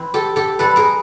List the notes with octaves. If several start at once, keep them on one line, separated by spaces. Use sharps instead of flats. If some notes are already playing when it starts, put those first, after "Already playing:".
Already playing: E3 C4
G4 A4
G4 A4
E3 G3 C4 A4 B4
G#4 A#4